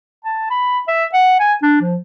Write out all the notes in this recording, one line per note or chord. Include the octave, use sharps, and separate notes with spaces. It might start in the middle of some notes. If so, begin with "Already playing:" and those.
A5
B5
E5
F#5
G#5
D4
F3